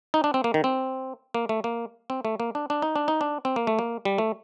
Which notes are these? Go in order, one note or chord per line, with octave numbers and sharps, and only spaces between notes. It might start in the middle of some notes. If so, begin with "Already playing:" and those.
D#4
D4
C4
A#3
D#3
C4
A#3
A3
A#3
C4
A3
A#3
D4
D4
D#4
D4
D#4
D4
C4
A#3
A3
A#3
G3
A3